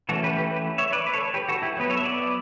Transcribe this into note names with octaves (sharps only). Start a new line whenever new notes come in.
E3 A3 C#4 F#4 A4
G4 B4
G4 B4
G4 B4
C#5 E5
B4 D5
B4
A4 C#5
G4 B4
F#4 A4
E4 G4
F#3 B3 B4
A4 C#5
E5
B4 D5